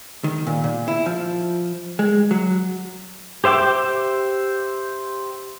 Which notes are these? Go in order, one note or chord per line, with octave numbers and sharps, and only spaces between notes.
D#3
A#2
A#2
E4
F3
G#3
F#3
G4 C5 E5 G5 D6